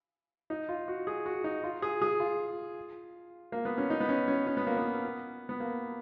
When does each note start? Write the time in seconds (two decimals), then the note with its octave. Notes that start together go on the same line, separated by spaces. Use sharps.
0.50 D#4
0.69 F4
0.88 F#4
1.07 G#4
1.26 F#4
1.44 D#4
1.64 F4
1.82 G#4
2.02 G#4
2.20 F4
3.52 A#3
3.65 B3
3.78 C#4
3.90 D#4
4.00 B3
4.09 C#4
4.28 C#4
4.47 C#4
4.57 B3
4.67 A#3
4.76 B3
5.49 B3
5.60 A#3